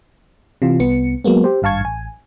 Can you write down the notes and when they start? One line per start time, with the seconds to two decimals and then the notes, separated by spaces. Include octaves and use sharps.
0.62 C3 E3 F4
0.79 C2 B3 C#7
1.24 F#3 G#3 A#3 B3
1.44 G4 C5
1.62 G#1 G2 F5 A5 C#6 G#6
1.81 A1 G#5